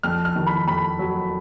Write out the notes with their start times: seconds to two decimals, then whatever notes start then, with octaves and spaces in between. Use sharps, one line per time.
0.03 F2 F6
0.25 F6
0.36 D#3
0.47 B5
0.67 F2 B5
0.99 F#3